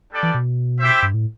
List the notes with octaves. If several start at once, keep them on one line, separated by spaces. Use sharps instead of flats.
G3 D4 A4 D5
E3
B2
C4 E4 G4 C5 E5
G2
A2